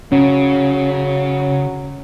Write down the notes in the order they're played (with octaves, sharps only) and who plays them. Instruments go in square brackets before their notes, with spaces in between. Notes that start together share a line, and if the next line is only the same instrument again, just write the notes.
[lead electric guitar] C#3 [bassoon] F#3 [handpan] C#4